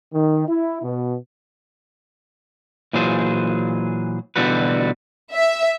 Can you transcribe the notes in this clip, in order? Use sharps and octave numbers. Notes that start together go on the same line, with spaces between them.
D#3
E4
B2
A#2 E3 F#3 G#4 C5
B2 D3 E3 G3 F#4 B4
E5